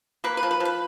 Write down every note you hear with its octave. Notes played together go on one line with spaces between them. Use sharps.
A#3 B4
B4
F3
B4
F3
B4